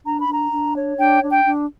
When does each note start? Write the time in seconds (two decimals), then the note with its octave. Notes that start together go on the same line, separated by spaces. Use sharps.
0.06 D4 A#5
0.20 B5
0.28 D4 A#5
0.52 D4
0.76 C#5
0.98 D4 G5
1.22 D4
1.29 G5
1.45 D4